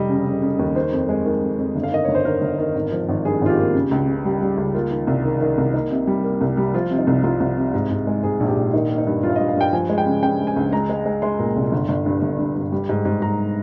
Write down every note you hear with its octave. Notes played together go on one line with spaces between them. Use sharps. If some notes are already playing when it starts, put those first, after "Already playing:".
Already playing: F1 G3 D#5
C#3
C#3
C#3
D#2
D#3 C5
F2
G#3
D#3
F2
F2
G1
F5
D#3 D#5
G1 C#5
C5
D#3 A#4
G1
D#3
G#1
F3
G#1
G2 G#4
G#1 F4
G4
A#3
C#3
C#2
C#3
G3
G3
C#2
A#3 F4
D#3
C2
D#3
D#3
C2
A#3 D#4
C3
G3
A#3
C2
G3
F3 F4
C3
D#4
C2
C2 F4
C2
C3
G#2
G#2
G#3
G#2 G#4
A#1
G4
A#1
D#3 D#4
A#3
D#4
G2
G2 F4
F5
D#5
G2
F5
G2 G5
F3 G#5
G#3
G5
C#3
C#3 G5
G#3
G#5
C#2
G#3 A#5
G#3
G#3
G#3 C6
A#2
C2
G1
G1
G2
G1
G2
G2
G3
G#2
G#2
G#2 A#5